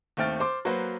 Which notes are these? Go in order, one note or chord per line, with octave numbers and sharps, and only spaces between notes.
D#2 A3 C4 G5 F6 A6
C5 C6 D6
F#3 A#3 F#4 B4 C5